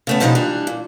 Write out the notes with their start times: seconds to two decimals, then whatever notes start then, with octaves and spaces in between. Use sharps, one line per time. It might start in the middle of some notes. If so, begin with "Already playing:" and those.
0.07 C#3 A3 B3
0.21 B2 F3 G#3 B3 D#4 G4
0.35 E3 G3 D4
0.67 A#2